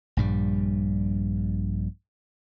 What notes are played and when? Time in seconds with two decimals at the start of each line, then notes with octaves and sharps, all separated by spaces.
0.17 A#1 G2 G3